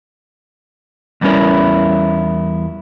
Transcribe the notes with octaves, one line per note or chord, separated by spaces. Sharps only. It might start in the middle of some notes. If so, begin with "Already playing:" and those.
E2 G3 B3 C#4 E4 A#4